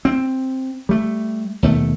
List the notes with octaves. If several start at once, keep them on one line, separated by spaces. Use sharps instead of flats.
C4
G3 A3
D#2 B2 A3